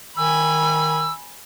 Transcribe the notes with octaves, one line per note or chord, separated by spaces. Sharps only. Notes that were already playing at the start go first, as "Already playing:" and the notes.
D#3 G#5 B5 E6